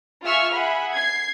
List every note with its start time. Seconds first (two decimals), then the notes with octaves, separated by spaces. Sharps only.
0.24 F4 G#4 E5 C#6 E6 F6
0.53 G#4 E5 F#5 B5
0.94 G#6 C7